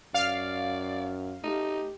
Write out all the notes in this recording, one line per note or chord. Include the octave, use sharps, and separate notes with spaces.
F#2 D5 F5
A3 D#4 G4